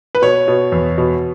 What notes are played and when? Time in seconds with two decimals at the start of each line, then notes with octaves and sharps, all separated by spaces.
0.15 B4
0.22 B2 C#5
0.48 B2
0.72 E2
0.98 B2